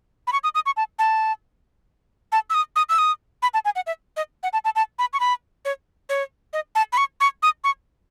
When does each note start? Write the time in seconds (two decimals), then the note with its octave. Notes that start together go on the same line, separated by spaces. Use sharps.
0.27 B5
0.33 C#6
0.44 D#6
0.55 D#6
0.66 C#6
0.77 A5
0.99 A5
2.32 A5
2.50 E6
2.54 D#6
2.76 D#6
2.89 E6
2.98 D#6
3.42 B5
3.54 A5
3.65 G#5
3.76 F#5
3.87 E5
4.17 D#5
4.43 F#5
4.53 A5
4.65 A5
4.76 A5
4.99 B5
5.13 C#6
5.20 B5
5.65 C#5
6.09 C#5
6.53 D#5
6.75 A5
6.93 B5
6.97 C#6
7.20 C#6
7.43 D#6
7.64 C#6